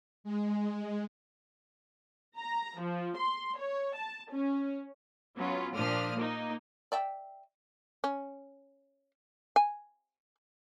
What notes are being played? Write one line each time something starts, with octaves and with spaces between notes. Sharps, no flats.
G#3
A#5
F3
C6
C#5
A5
C#4
F#3 B3 C#4 F4
A#2 F3 D4 D#6 F6
A#3 D#4
D5 E5 G5
C#4
G#5